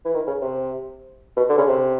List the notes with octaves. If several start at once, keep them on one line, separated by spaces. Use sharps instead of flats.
E3
D#3
C#3
C3
B2
D3
C#3
C3